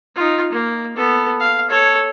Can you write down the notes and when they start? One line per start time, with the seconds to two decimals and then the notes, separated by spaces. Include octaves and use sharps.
0.16 D#4 F4
0.52 A#3
0.97 B3 A4
1.40 F5
1.70 A4 C#5